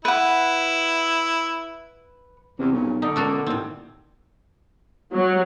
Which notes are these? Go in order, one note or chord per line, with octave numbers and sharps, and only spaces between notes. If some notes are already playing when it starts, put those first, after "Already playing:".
E4 B4 F#5
E2 C3
B1 G2 A#2 C#4
B2 D3 D#4
C#2 A#3 F#4 A4
D#2 A2 C4
F#3